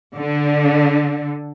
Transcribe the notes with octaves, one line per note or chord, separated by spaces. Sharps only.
D3